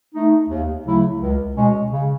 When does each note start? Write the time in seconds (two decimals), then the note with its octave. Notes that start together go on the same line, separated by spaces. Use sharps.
0.14 A3 D#4
0.50 D#2
0.86 C#3 F#3 A3 E4
1.21 C#2
1.56 B2 G#3 C#4
1.92 C#3